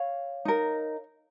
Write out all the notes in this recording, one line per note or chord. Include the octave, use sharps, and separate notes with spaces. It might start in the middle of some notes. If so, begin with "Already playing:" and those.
Already playing: C#5 F5
D#4 A#4